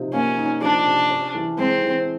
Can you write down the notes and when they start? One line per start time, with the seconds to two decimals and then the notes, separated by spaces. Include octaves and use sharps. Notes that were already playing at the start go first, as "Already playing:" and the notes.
Already playing: C3 F3 D#4
0.13 A#3 C#4
0.38 D#4
0.62 F3 D4
0.86 C3
1.10 C#4
1.35 E3
1.58 G#3 C4
1.82 E3